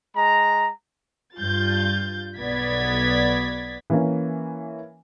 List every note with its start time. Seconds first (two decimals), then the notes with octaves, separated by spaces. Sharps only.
0.15 G#3 A#5
1.38 G2 F4 G6 A6
2.38 B1 B3 D5 G#6 A6 B6
3.90 E3 A#3 C#4